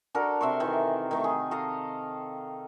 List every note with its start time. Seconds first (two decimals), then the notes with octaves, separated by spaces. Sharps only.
0.14 D4 F#4 A4 A#4
0.41 C3 E5 C6 C#6
0.60 D#3 E3
1.11 D#3 A3
1.24 G#4
1.51 A4 D#5 F5 A#5